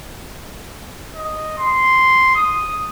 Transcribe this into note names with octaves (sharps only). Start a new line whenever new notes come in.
D#5
C6
D#6